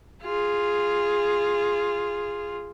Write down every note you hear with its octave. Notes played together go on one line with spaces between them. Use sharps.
F4 G#4